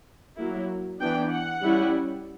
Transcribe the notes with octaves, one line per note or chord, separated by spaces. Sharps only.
F#3 A#3 E4
E3 B3 D4 G5
F#5
G3 C#4 E4